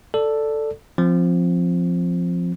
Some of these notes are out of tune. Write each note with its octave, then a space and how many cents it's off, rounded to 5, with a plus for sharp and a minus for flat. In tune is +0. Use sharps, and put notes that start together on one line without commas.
A4 +5 D5 +0
F3 +0 C4 +0